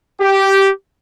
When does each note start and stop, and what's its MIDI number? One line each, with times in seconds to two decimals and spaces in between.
0.20 0.69 67